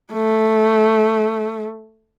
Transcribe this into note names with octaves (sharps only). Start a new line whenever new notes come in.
A3